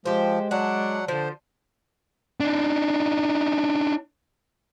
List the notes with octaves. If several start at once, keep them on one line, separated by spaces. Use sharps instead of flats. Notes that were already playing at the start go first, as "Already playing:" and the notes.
F3 G#3 G4 C5
F#3 D4 F#5
D3 F3 C5
D4 D#4